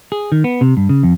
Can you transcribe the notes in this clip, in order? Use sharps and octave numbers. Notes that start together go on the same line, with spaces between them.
G#4
D#3
B3
C3
G2
C#3
F2